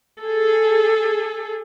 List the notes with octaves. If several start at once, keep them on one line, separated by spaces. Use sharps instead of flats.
G#4 A4